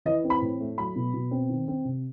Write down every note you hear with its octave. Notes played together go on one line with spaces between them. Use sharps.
E3 D#5
C4
B5
A2
A3
F#3 B5
B2
B2
C4
D#3
C4
C3